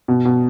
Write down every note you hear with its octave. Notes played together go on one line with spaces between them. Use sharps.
B2
B2